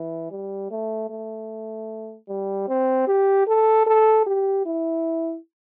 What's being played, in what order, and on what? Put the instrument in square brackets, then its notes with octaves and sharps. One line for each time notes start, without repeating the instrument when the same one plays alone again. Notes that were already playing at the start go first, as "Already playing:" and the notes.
Already playing: [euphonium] E3
G3
A3
A3
G3
C4
G4
A4
A4
G4
E4